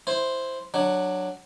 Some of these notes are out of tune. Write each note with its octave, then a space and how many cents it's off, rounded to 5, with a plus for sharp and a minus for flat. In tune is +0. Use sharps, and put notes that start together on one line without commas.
E4 +0 C5 +0
F#3 +0 D4 +10